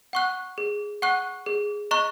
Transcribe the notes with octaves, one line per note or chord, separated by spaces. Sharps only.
F#5 C#6 F#6
G#4
F#5 C#6 F#6
G#4
D#5 A#5 C#6 F#6